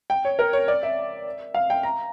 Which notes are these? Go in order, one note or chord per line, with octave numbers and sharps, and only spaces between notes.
G5
C#5
A#4
C#5
D5
E5
F5
G5
A#5